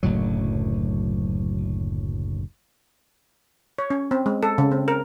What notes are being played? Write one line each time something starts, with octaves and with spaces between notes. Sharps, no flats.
F#1 D2 A2 F#3
C#5
C#4
C4
G#3
A4
C#3
C4
A#4